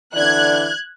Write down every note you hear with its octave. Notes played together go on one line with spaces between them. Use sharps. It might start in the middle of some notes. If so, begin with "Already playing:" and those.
D3 E3 D5 F#6 G#6